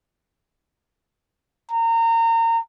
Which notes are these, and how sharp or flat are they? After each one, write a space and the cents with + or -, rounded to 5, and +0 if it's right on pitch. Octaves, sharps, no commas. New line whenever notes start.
A#5 -30